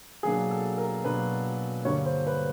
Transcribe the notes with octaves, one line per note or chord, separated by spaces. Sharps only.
B2 F#3 A#3 D4 G#4
A4
A#4
B2 F#3 A#3 D4 B4
G2 D3 G3 A#3 D4 C#5
C5
B4